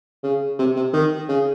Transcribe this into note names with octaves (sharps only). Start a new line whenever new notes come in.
C#3
C3
C3
D#3
C#3